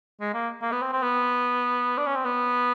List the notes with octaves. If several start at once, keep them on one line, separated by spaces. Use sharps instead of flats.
G#3
A#3
A#3
B3
C4
C4
B3
D4
C#4
C4
B3